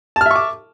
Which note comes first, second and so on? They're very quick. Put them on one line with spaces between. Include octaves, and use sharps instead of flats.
A5 F6 E5 C#6 D6